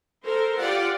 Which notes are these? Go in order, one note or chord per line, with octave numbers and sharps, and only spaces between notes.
A4 A#4 C5
F4 G4 D5 F#5